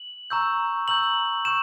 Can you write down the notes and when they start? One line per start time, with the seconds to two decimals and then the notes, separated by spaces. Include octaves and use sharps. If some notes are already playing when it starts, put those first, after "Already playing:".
Already playing: F#7
0.30 A#5 C#6 E6 G6
0.88 A#5 C#6 E6 G6 F#7
1.45 C#6 E6 G6 E7